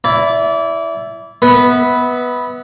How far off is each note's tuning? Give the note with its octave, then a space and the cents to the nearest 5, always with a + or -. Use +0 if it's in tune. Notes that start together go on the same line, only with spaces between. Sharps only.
E4 +5 D5 -30
B3 +0 B4 +0 E5 -35